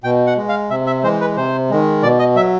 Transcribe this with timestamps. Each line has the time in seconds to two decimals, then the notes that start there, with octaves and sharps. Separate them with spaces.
0.04 B2 G5
0.27 F#5
0.37 G#3
0.49 F5
0.70 C3 E5
0.87 E5
1.03 E3 G#3 C5
1.21 B4
1.37 C3 C5
1.70 D#3 G#3
2.03 B2 D5
2.19 D#5
2.36 F#3 E5